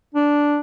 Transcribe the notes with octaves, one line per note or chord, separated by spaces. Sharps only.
D4